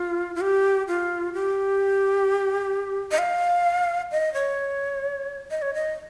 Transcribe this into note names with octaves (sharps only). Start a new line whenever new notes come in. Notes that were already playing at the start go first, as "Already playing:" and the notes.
Already playing: F4
F4
G4
F4
G4
D#5
F5
D#5
C#5
D#5
C#5
D#5